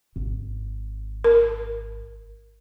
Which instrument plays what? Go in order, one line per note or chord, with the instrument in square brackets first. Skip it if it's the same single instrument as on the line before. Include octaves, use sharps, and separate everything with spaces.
[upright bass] G#1
[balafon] A#4